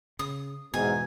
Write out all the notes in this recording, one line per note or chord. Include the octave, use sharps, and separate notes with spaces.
C#3 D#6
E2 G#2 B2 G#5